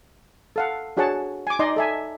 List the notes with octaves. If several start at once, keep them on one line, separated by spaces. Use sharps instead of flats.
A4 F5 F#5
D4 F#4 G#4 C#5 F#5 A5
G#5 D6
D#4 D5 D#5 C6
A4 E5 G#5